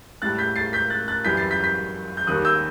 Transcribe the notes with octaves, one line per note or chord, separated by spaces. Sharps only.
A2 G3 F#6 A6
G6 B6
A6 C7
G6 B6
F#6 A6
F#6 A6
F#2 E3 G3 G6 B6
A6 C7
G6 B6
G6 B6
G6
D#2 D#3 G3 D#6 F#6
E6 G6